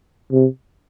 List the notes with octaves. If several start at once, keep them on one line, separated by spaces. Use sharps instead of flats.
C3